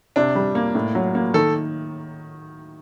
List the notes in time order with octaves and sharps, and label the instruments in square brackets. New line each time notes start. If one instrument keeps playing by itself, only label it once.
[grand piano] C3 [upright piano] D4
[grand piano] G3
A#3
A2
F#3
A#3
[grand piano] D#3 [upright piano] A4